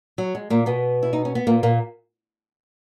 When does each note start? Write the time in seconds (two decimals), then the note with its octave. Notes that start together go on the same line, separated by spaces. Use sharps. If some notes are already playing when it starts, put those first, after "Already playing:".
0.18 F#3
0.35 G#3
0.50 A#2 A#3
0.66 B2 B3
1.03 E4
1.13 D#4
1.25 C#4
1.35 B3
1.47 A#2 A#3
1.63 A#2 A#3